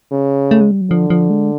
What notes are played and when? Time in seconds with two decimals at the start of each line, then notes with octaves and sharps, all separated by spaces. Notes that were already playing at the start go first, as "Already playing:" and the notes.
0.12 C#3
0.51 A3
0.61 G#3
0.71 G3
0.81 F#3
0.91 D3 F3
1.10 F3
1.30 G#3